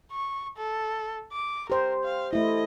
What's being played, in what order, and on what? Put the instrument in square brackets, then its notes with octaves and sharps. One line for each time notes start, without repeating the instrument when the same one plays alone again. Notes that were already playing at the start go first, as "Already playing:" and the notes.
[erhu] C#6
A4
D6
[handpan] G4 C5 [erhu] A#4
[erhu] F5
[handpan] A3 E4 [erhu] D#5